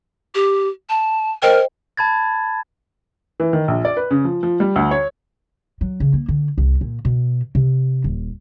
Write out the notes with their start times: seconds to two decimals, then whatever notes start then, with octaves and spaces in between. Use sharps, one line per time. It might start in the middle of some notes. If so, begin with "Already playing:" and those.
0.35 G4
0.89 A5
1.42 A#4 C5 D#5 G5
1.97 A5 B5 G#6 A6
3.40 E3
3.53 D#3
3.68 A#1
3.85 D5
3.97 B4
4.11 C#3
4.24 F3
4.43 F3
4.60 G3
4.76 D2
4.91 C#5
5.81 F#3
6.00 C#3
6.14 A#3
6.28 D3
6.58 C2
6.81 A#2
7.05 B2
7.55 C3
8.04 D#1